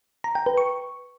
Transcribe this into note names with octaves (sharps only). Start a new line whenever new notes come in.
A#5
G5
B4
C#6